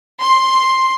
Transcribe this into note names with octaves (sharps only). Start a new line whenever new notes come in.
C6